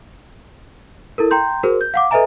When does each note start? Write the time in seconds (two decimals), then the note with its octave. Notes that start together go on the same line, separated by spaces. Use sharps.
1.18 E4 A4 A#4
1.31 G5 A#5 C6 G6
1.63 F#4 G#4 A#4 C5
1.81 G6
1.94 F5 F#5 D6
2.11 A4 B4 D#5 E5 G#5 A#5